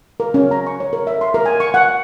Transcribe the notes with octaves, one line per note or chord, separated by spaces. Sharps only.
A#4
C#4
A#5
C#6
C#5
A#4
E5
C6
A#4
G#5
C#6
F#5